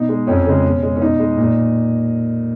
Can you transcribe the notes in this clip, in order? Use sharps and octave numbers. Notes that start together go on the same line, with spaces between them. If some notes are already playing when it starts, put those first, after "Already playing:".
Already playing: B2 D#4
G#3
F2 C#4
C#3 G#3
B2
G#3
C#4
B2 D#4
G#3
A#2